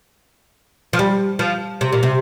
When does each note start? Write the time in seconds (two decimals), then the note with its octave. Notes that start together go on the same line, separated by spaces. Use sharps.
0.93 F3
0.99 G3
1.39 F3
1.81 C3
1.92 A#2
2.03 C3